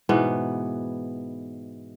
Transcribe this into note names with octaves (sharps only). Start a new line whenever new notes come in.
G#2 B2 E3 B3